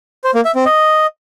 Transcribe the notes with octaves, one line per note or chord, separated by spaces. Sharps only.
C5
A#3
E5
C4
D#5